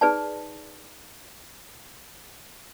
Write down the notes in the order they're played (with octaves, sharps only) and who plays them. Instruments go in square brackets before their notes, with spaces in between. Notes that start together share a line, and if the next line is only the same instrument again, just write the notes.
[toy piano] D#4 G#4 B4 D5 A5